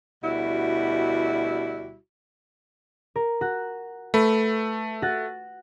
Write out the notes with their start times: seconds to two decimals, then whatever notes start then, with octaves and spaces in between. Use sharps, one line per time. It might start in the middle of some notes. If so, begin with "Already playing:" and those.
0.23 D2 B2 G3 E4 F#4
3.16 A#4
3.41 F#4
4.14 A3 B4
5.02 F#4 A6